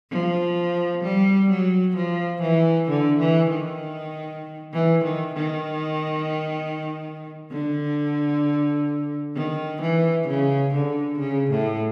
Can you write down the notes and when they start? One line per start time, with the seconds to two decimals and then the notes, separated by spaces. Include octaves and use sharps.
0.11 F3
1.03 G3
1.50 F#3
1.96 F3
2.42 E3
2.88 D3
3.19 E3
3.50 D#3
4.73 E3
5.04 D#3
5.34 D#3
7.51 D3
9.35 D#3
9.82 E3
10.28 C#3
10.74 D3
11.19 C#3
11.51 A2